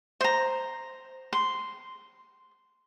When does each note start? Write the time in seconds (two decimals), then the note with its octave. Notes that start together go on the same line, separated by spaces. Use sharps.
0.21 C5 A#5
1.33 C6